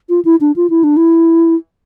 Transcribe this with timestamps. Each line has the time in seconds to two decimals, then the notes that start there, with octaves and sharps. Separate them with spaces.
0.09 F4
0.25 E4
0.41 D4
0.56 F4
0.70 E4
0.83 D4
0.96 E4